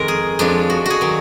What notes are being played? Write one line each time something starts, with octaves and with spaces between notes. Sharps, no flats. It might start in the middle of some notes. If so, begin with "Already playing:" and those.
Already playing: F2 D#3 G#3 A#4
G#4
F2 F3 G#3 D4
F#4
F#4 G#4
D#3 F#3